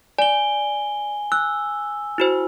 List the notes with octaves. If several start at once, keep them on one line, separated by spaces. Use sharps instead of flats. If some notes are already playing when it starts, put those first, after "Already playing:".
D5 G#5 G7
E6 F#6
E4 F#4 C5